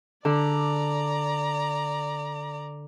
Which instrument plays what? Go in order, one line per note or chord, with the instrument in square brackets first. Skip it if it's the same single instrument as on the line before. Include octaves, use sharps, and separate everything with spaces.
[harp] D3 [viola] D5 A#5